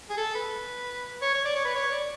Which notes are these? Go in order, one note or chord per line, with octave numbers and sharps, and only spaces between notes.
G#4
A4
B4
C#5
C#5
D5
C#5
B4
C#5
D5